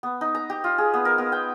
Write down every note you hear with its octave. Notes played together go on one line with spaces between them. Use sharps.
B3
D#4
A#5
G4
F4
G#4
B3
A#4
B3
G5